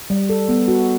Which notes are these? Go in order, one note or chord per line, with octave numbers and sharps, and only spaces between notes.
G3
A4
B3
F#4